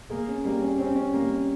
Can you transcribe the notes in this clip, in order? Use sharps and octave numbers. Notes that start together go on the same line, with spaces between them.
A#3 G#4
C#4
G3 A#3
C#4
C4 C#4
C#4
G3 A#3
C#4